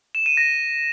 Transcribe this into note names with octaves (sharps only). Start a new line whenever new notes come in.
E7
D#7
A#6